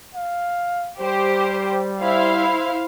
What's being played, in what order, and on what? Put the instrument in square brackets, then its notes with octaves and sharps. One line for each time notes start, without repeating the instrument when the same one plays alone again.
[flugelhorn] F5
[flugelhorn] G3 [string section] G4 C5
[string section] E4 C5 F5